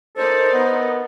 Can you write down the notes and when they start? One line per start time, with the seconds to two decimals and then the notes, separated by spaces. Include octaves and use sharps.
0.16 D#4 A4 A#4 C5 D5
0.54 B3 D#5